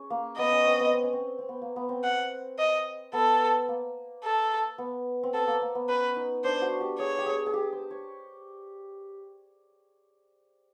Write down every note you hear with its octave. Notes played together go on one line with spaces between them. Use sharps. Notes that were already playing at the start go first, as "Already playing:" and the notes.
Already playing: C#4 G#4
A#3
B3 D#5
C#4
C4
B3
C4
C#4
C4
C4
B3
A#3
B3
C4
F#5
D#5
B3 A4
A#3
A4
B3
C4
B3 A4
A#3
A#3
B3
C#4 B4
D#4
D4 C5
F#4
G4
G#4 C#5
G4
G#4
G#4
G4
C5
C#5